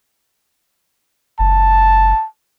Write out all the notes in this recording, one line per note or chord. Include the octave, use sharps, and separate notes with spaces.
F#1 A5